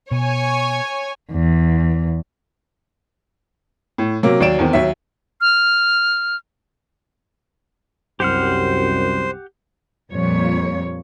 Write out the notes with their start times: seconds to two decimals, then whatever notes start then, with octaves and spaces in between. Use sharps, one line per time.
0.11 B2 C#5 G#5
1.30 E2
3.98 A2
4.23 C3 F#3 A#3
4.40 D#2 F#3 D5 D7 E7
4.59 E2 D#3 C4
4.73 D#2 F#3 E5
5.41 F6
8.20 C2 F#2 G4 C5 F#5 F6
10.10 F2 A#2 G3 C#5